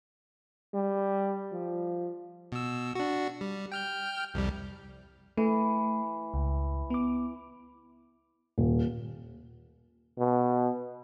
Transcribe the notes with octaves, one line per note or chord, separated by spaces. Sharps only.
G3
F3
B2 E6
D4 F#4
G3
G5 F6 G6
C2 F2 G3
E3 A3
C#2
B3 D6
D#1
B2